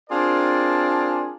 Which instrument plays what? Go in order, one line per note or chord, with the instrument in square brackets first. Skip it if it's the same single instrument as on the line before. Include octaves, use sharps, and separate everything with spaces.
[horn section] C4 D4 F4 G#4 A#4 D5